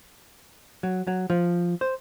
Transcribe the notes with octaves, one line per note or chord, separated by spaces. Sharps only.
F#3
F#3
F3
C5